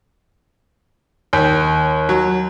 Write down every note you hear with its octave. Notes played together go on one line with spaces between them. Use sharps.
D#2
F#3